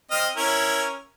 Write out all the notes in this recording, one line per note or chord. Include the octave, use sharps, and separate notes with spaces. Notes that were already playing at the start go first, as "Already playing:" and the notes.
C4 D#5 F6
C#4 E4 A#4